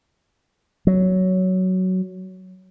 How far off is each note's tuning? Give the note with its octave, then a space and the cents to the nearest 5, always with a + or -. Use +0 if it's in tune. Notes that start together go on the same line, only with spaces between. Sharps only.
F#3 +10